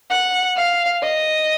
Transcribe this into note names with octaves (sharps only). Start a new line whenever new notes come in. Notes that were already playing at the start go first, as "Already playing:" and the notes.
F#5
F5
D#5